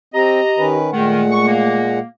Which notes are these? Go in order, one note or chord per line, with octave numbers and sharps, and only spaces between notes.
C4 G4 D#5 A#5
D#3 C#4 B4
A#2 D#3 G#3 A3 F#5
C#6
A#3